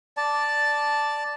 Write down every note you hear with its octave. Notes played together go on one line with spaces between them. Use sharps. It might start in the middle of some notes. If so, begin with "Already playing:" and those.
D5 A5